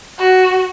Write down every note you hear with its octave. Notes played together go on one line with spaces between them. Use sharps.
F#4